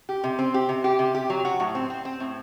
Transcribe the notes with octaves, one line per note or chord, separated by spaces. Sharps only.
G4
C3
C4
G4
C3
G4
C3
G4
F#3
F#4
A2
C4
C4
C4
A2